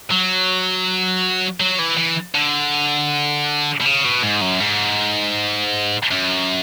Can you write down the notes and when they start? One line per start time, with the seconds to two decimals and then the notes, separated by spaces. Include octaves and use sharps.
0.11 F#3
1.60 F#3
1.79 E3
1.98 E3
2.35 D3
3.80 B2
3.85 C#3
4.05 B2
4.23 G#2
4.41 F#2
4.60 G#2
6.11 F#2